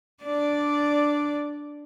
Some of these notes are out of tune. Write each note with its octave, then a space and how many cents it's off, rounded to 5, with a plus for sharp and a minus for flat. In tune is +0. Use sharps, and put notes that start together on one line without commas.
D4 +0 D5 -5